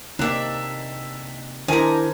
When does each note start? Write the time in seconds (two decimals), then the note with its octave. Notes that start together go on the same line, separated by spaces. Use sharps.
0.19 C3 A#3 D4 D#4 D5 E5
1.68 D#3 D4 E4 A#4 C5 G#5 A#5